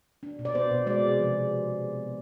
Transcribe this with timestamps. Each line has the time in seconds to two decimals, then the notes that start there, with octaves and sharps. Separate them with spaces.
0.23 D4
0.39 B2
0.45 D5
0.55 B3 C5
0.71 B2
0.86 G#3 D5
1.03 C3
1.19 F3